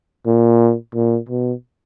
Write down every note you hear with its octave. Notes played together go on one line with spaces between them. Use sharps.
A#2
A#2
B2